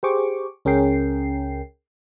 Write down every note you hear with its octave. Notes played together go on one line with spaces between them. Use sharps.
G4 G#4 C5 C#6 D6
C#2 C#4 G#4 A#4 G5 C7